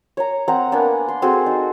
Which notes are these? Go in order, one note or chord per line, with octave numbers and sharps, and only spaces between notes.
C#5 A#5
C4 F#5 A#5
A#3 B3 D4 G#5
C6
C4 F#4 G#4 A4
D#4